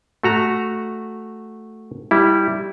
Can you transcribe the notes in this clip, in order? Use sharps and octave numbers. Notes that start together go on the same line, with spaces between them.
A3 F#4 A#5
G3 E4